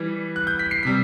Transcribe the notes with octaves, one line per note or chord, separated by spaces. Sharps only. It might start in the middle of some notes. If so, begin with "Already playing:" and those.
Already playing: E3 G3
F#6
G6
B6
C7
C3 G3 B6